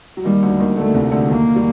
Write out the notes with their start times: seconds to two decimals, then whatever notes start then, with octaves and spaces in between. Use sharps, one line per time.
0.17 F#3
0.25 D#2 D#3 G3
0.43 D2 D3
0.59 D#2 D#3
0.77 D2 D3 A3
0.94 C2 C3
1.12 D2 D3
1.29 D#2 D#3 A#3
1.56 G3